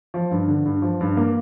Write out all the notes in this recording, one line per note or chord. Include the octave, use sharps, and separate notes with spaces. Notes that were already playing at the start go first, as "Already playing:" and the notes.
F3
G2
D3
G2
F3
G2
A#3